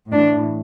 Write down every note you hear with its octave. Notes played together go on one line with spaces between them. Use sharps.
A2 E3 D4